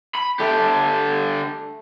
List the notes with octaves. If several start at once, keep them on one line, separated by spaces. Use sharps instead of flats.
B5
D3 A3 G4